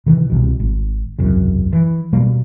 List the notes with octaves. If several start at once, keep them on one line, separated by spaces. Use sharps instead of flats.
C3 D#3 E3
C2 B2
G#1
E1 C2 F#2 C#3
E3
B2 G3 A#3